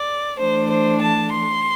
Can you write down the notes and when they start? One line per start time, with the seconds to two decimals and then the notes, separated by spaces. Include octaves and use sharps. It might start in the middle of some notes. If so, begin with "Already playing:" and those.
Already playing: D5
0.41 E3 A3 D4 C5
0.71 C5
1.01 A5
1.32 C6